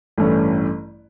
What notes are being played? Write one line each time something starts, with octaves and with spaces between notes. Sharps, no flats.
A1 G2 E3 A3 C#4